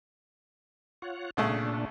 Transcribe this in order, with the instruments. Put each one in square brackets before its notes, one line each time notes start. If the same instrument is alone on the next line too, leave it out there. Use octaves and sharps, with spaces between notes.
[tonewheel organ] F4 C#5 F#5
[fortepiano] C2 C#3 A3 [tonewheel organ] A#2 D4